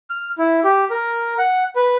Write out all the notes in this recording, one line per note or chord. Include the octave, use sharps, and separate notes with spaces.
F6
E4
G4
A#4
F#5
B4